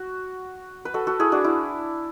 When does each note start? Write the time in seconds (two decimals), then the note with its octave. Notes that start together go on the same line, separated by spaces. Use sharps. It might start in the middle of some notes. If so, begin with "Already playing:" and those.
Already playing: F#4
0.85 B4
0.94 F#4 A4
1.07 F#4 A4
1.20 E4 G#4
1.32 D4 F#4
1.44 E4